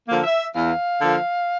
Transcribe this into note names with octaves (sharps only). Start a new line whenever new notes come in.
D3 F3 A#3
E5
E2 F5
D3 F3 A#3